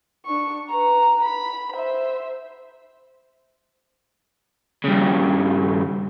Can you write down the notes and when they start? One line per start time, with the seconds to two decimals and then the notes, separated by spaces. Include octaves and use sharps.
0.26 D4 C#6
0.69 B4 A#5
1.23 B5
1.72 C5 E5
4.84 G2 C#3